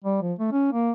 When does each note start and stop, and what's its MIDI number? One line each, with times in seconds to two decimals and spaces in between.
0.04 0.17 55
0.22 0.33 53
0.39 0.50 57
0.52 0.70 61
0.72 0.92 58